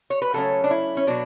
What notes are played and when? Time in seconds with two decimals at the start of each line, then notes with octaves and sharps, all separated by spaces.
0.10 C#5
0.22 B4
0.33 C#3 F#3 A3 C#4 A4
0.64 D4
0.71 E4
0.97 C#4
1.07 B2 F#3 D4